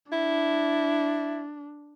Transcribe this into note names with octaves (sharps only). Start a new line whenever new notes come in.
D4 E4